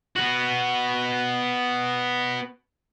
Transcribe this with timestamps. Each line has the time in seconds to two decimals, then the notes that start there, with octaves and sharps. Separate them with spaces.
0.16 B3 F#4